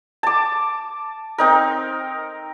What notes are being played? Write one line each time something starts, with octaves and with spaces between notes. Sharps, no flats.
A5 D6
C4 D#4 A#4